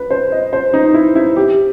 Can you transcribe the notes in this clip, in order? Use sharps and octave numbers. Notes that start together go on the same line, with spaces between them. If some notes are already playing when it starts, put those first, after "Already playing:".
Already playing: B4
C5
D#5
C5
D#4
E4
E4
G4